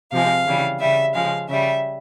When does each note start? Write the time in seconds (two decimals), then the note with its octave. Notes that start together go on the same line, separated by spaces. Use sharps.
0.12 C3 F3 G#3 F5
0.46 C#3 E3 G3
0.80 C#3 G3 E5
1.14 C#3 F3 G#3 F5
1.48 C#3 G3 E5